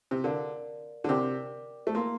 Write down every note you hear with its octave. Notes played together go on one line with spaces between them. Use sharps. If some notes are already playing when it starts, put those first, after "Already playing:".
C3
D3 A#4 D5 F5
D3
C3 A#4 D5 G5 D6
A3
A#3 E4 A#4 F5 C6